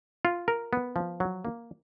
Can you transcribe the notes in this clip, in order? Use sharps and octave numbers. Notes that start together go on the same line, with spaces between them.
F4
A#4
B3
F3
F#3
A#3